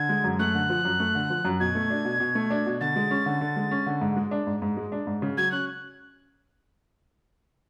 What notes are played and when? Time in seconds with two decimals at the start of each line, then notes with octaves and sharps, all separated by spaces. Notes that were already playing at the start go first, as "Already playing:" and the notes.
Already playing: D3 G#6
0.09 G#3
0.24 F#2
0.39 A3 F#6
0.55 D3
0.70 F3
0.85 F#2
1.00 A3
1.15 D3
1.30 F3
1.45 F#2
1.60 B2 G#6
1.75 A3
1.90 D4
2.05 B2
2.20 B2
2.35 A3
2.50 D4
2.66 B2
2.81 D3 A6
2.96 G#3
3.11 C#4
3.26 D3
3.41 D3
3.56 G#3
3.71 C#4
3.86 D3
4.01 G#2
4.17 G#3
4.31 D4
4.47 G#2
4.62 G#2
4.77 G#3
4.92 D4
5.07 G#2
5.22 C#3
5.37 F#3 G#6
5.52 C#4 F#6